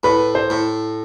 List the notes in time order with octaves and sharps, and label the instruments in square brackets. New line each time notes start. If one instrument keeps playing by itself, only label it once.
[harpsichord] A2 [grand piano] B4
[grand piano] C5
[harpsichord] A2